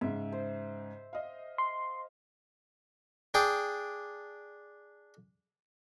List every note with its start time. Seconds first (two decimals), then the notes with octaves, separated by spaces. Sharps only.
0.01 G#2 C#3 E5
0.32 C5
1.13 D#5 F5
1.58 C6
3.34 D4 G#4 G5 D6